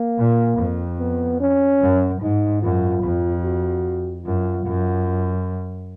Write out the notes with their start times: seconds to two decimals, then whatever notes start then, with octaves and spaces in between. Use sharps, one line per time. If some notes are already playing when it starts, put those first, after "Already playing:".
Already playing: A#3
0.18 A#2
0.59 F2
0.99 B3
1.40 C#4
1.82 F#2
2.22 G#2 D#4
2.63 F#2 F4
3.04 F2
3.44 F#4
4.26 F#2 F4
4.66 F#2